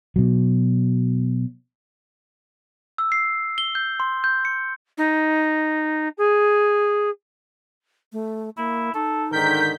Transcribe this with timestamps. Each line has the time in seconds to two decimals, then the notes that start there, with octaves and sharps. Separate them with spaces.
0.16 B2 F#3
2.98 E6
3.12 C7
3.58 G7
3.75 G6
4.00 C6
4.24 G6
4.45 C#7
4.97 D#4
6.17 G#4
8.13 A3
8.57 A#3 E4
8.95 D#4 A4
9.32 G#2 D3 D#3 A#4 G6 B6